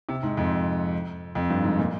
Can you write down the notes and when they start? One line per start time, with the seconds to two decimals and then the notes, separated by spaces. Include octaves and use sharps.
0.09 C3
0.23 G#2
0.37 F2
1.35 F2
1.50 G2
1.64 G#2
1.78 A#2